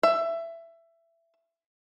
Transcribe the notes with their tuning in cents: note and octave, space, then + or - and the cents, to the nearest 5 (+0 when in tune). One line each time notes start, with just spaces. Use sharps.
E5 +15